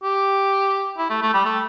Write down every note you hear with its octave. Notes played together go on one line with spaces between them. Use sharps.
G4
E4
A3
A3
G3
A3